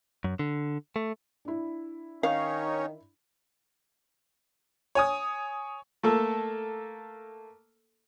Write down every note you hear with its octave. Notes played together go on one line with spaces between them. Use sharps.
F#2
D3
A3
D4 E4
D#3 C#4 D#4 C#5 F5
C#5 G#5 D#6
A3 A#3 A4 E6